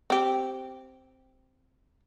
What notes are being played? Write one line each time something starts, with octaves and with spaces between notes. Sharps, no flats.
C4 G4